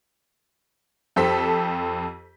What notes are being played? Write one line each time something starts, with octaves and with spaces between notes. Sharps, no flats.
F2 G4 A4 C5 B6